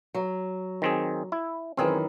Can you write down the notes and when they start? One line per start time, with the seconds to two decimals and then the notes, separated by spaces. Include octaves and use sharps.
0.14 F#3
0.82 D#3 C4 G#4
1.32 E4
1.77 F#2 D#3 E3 C4 G#4